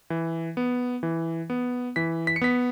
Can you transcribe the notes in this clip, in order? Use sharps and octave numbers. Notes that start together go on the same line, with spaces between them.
E3
B3
E3
B3
E3 B6
B6
C#7
B3 B6